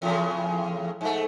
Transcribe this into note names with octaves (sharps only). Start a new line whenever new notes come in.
E2 A2 C#3
G#2 A3